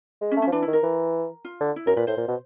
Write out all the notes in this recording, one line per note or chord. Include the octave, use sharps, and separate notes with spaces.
G#3
C#4
A3
C#4
F3
E3 D4
E4
D#3
A#4
E3
F4
D3
E4
F#2 A#4
A#2 B4
A2 C5
A#2
B2